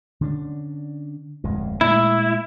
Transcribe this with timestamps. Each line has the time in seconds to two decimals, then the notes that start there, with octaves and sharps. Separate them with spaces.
0.21 D3 C#4 D4
1.44 D1 F2 G#3
1.81 A#2 G#3 A3 E4